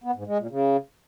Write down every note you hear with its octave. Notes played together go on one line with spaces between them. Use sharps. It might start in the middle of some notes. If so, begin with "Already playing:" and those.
B3
G#2
G#3
A#2
C#3